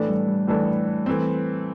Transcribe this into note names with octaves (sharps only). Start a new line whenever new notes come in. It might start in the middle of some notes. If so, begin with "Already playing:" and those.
Already playing: A2 E3 A3 D4 A4
G3
G3
A2 E3 A3 D4 A4
E3 A3 C4